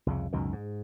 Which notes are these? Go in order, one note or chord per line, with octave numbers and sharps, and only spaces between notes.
C2 F2 C#3
C#2 F#2 B2 D#3
G#2